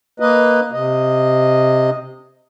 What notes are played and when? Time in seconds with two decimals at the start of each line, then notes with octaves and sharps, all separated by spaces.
0.20 A#3 B4 D#5
0.72 C3 D#5